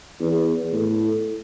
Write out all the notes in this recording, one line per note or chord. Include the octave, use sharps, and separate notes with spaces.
E2
A2